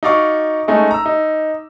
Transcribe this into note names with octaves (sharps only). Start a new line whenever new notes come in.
D#4 F#4 D5 F5 C#6 D6
G#3 A3 C#4 D#4
A#5 E6
D#4